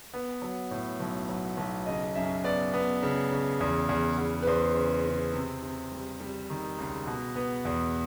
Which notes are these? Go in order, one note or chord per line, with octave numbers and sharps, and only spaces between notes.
B3
F#3
A2
B1
F#3
B1
C#3 D#5
F#2 E5
B3 D5
B3
C#3
C#3
E2
E2
E2
B4
E2 C5
C#3
C#3
C3
C3
G3
G3
D#3
C#2
B2
B3
E2